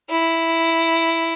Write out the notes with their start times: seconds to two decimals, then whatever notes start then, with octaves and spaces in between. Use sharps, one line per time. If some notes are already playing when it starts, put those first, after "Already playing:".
0.10 E4